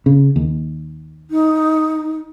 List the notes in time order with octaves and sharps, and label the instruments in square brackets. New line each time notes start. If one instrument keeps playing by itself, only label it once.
[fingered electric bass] C#3
D#2
[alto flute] D#4